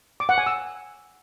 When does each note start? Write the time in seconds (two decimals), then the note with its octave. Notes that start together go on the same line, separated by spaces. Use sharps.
0.20 D6
0.29 F#5
0.38 G#5
0.47 E6